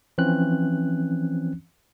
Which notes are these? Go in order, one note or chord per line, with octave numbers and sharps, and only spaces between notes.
E3 F3 C4 C#4 F#6